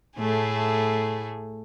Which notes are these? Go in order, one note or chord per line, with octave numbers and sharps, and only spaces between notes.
A2 A3 G#4